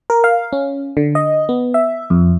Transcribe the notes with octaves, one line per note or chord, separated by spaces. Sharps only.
A#4
F5
C#4
D3
D#5
B3
E5
F2